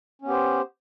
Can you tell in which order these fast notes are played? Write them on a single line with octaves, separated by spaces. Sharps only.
C#4 B3 G4 C5